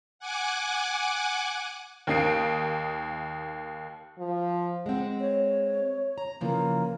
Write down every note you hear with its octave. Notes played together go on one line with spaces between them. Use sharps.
F#5 G#5 D6
D#2 A#3 D#4 C7 D7
F3
G#3 C4 F#5
C#5
A#5
C#3 E3 F3 A#3